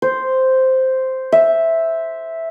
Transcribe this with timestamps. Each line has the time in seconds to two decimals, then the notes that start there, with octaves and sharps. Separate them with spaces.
0.02 C5
1.32 E5